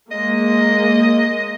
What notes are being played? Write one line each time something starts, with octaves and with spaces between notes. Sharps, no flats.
G#3 A#3 D#5